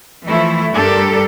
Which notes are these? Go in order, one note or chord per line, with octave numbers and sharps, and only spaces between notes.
E3 F3 A3 E4
G2 G3 D4 G4 A4 A#4